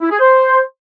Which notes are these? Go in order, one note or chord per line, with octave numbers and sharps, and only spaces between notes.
E4
G#4
C5